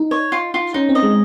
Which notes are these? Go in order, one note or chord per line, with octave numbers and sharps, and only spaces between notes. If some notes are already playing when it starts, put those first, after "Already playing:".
Already playing: D#4
C#5
F4
F4
C#4 D#4
C4
D#5
G#3